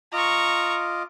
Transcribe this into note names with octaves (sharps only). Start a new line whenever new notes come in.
F4 D#5 A#5 C#6 D6